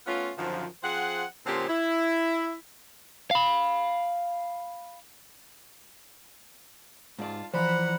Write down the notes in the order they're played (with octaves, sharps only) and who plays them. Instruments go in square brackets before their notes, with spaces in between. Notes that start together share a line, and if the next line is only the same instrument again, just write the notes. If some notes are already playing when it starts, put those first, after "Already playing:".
[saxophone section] A3 B3 C#4 F4
F#2 D3 D#3 F3
F3 C4 G#4 C5 F#5
A#2 D3 F3 C4 C#4 G4
E4
[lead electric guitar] F5 B5
[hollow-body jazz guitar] G#2 D5 [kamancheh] F4 A5
[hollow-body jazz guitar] E3 F3 [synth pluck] C5 D5 B5 [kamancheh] F#5 A#5